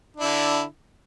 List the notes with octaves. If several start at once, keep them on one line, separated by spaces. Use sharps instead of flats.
D3 D4 E4